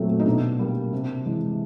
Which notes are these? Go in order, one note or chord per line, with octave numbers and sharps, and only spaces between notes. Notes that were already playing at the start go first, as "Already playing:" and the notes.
Already playing: A#2 F#3 A3 C4
D#4
B2 D4
G3 A#3
C3
E3 G#3